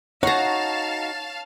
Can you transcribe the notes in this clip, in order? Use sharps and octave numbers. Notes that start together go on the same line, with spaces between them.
D#4 F#4 C#5 F5 F#5 A5 A#5